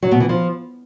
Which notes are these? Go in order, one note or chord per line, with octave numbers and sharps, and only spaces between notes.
F#3
B2
E3
F3